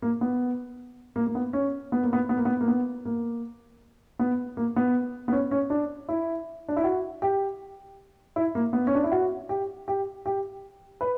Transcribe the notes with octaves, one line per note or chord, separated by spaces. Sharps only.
A#3
B3
A#3
A#3
B3
C#4
B3
A#3
B3
B3
A#3
B3
A#3
B3
A#3
B3
A#3
B3
B3
C#4
C#4
D4
E4
D4
E4
F#4
G4
E4
A#3
B3
C#4
D4
E4
F#4
G4
G4
G4
B4